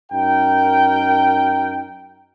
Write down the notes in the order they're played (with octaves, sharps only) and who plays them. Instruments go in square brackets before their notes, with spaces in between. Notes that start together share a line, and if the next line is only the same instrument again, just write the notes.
[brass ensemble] F#2 D#4 A#4 G5